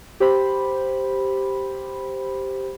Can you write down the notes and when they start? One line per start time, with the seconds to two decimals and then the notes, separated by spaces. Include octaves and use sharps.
0.20 G4 C5 B5